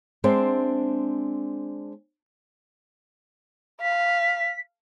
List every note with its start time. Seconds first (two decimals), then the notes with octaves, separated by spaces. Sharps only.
0.24 G#3 C4 D4 C5 E5
3.81 F5 B6